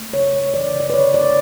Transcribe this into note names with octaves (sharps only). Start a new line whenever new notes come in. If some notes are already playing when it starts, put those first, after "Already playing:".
Already playing: A3
C#3 C#5
A3
E3 D5
C#3
D5
B4
D3 C#5
A3 D5